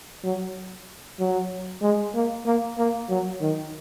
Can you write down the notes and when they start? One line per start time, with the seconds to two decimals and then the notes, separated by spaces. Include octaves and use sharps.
0.24 F#3
1.20 F#3
1.82 G#3
2.15 A#3
2.46 A#3
2.78 A#3
3.10 F#3
3.41 D#3